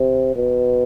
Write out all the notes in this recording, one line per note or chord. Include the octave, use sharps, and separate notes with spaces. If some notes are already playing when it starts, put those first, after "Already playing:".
Already playing: C3
B2